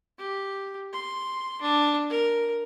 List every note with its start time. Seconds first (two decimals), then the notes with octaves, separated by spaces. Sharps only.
0.18 G4
0.93 C6
1.61 D4
2.10 A#4